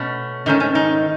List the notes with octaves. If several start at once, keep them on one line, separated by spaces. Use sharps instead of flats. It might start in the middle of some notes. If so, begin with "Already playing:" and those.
Already playing: B2 A3 C#4
G#2 D#3 A3 C#4 D#4
C#4
D#4